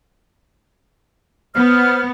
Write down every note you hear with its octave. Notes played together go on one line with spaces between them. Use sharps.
B3 C5 F6